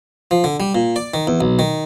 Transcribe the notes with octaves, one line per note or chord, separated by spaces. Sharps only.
F3
D3
G3
A#2
D5
D#3
E2
B1
D#3